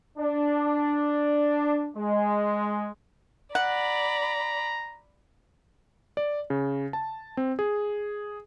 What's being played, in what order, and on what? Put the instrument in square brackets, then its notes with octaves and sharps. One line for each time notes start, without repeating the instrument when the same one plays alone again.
[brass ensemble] D4
G#3
[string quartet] D5 B5 [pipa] F#5 [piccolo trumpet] A#5
[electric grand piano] D5
C#3
A5
C4
G#4